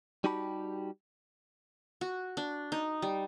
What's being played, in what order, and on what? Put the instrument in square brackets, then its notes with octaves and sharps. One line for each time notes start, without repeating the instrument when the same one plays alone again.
[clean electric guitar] G3 D#4 F#4 G4 A5 B5
[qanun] F#4
D4
D#4
G3